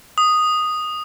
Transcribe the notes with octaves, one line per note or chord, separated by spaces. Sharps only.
D#6